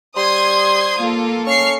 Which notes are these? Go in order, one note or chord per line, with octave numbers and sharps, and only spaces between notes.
G3 C5 C6 D#6 G#6
A#3 F4 A4
C#4 C#6 F6 C7